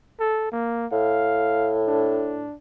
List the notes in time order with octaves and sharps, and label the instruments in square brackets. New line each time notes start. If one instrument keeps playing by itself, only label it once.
[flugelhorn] A4
A#3
[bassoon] A2 [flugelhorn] F5
[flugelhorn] D4